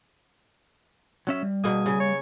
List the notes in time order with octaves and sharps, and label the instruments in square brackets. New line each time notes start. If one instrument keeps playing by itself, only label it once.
[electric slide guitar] F#3 C#4 E5
G3
[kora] B2 A#3 [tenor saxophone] G#4
[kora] C#3
[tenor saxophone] C#5